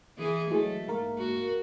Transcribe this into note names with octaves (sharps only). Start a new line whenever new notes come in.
E3 G#4
E3 F#3 G#3 A3
G#2 A#3 A#4
F#4